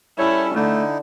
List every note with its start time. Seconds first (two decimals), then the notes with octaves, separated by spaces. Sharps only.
0.19 G3 C#4 E4 A4 C#5
0.55 D3 A3 D#4 E4